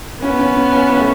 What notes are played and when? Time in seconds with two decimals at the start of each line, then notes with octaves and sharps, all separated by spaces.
0.22 B3 C#4
0.39 C#4
0.56 C#4
0.72 C#4
0.90 C#4
0.98 A3